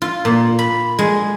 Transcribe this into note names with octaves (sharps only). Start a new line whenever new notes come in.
F4
A#2
B5
G#3